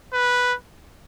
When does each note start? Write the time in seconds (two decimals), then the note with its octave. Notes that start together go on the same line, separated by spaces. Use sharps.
0.13 B4